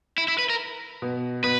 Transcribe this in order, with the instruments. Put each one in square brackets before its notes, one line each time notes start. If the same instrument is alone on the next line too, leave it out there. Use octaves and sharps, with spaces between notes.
[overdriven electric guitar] E4
E4
B4
A#4
[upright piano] B2
[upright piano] B2 [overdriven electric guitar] B4